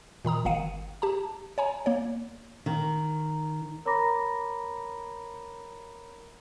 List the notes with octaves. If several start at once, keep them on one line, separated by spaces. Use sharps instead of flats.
A#2 D#3 A#5 D#6
G1 D#3 F5 C#7 D#7
G4 A5 A#5
C#5 G#5 A#5
A#3 C#5
D#3
A#4 C#5 A#5 B5 D6 A#6